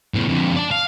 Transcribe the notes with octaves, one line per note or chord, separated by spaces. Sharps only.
E2 A2
F2 D3
D5 A5
F5